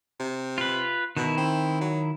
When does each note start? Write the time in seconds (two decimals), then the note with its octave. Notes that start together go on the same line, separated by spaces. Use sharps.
0.20 C3
0.58 F4 B4
1.17 B2 D#3 E4
1.37 C4
1.81 F#3